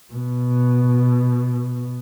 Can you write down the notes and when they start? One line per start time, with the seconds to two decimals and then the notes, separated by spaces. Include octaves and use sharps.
0.13 B2